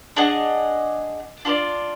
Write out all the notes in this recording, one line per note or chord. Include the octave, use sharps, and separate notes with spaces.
D4 G#4 D#5 F#5
D4 F4 B4 D5